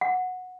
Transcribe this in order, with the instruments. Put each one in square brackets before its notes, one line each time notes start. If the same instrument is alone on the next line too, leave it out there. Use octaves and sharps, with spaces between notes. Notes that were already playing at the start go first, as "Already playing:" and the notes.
[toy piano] F#5